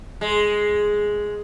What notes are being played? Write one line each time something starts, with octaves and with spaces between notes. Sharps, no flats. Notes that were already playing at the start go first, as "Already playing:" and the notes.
G#3